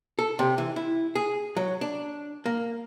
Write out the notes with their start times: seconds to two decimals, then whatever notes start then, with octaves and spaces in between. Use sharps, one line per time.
0.19 A4
0.39 C3
0.58 E3
0.76 E4
1.15 G#4
1.57 F#3
1.81 D4
2.46 A#3